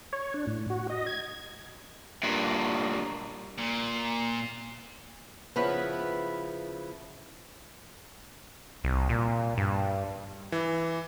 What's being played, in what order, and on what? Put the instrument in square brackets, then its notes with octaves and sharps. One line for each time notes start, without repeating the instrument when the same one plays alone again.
[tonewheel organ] C#5
D4
A2
F#4
D#5
G#6
[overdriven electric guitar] G2 A#2
[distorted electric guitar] A#2
[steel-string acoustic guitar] C#3 F3 B3 E4 B4
[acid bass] C2
A#2
G2
[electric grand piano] E3